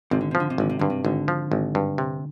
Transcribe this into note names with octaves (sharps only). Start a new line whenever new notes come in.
G#1 C3
D3
C3
F3
D3
C3
G#1 D3
C3
G2 D3
C3
G#1 D3
F3
G#1
G2
C3